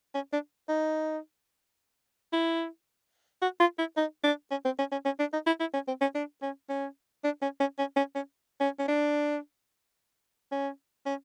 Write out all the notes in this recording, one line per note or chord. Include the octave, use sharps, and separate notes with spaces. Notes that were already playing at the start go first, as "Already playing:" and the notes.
C#4
D4
D#4
E4
F#4
F4
E4
D#4
D4
C#4
C4
C#4
C#4
C#4
D4
D#4
E4
E4
C#4
C4
C#4
D4
C#4
C#4
D4
C#4
C#4
C#4
C#4
C#4
C#4
C#4
D4
C#4
C#4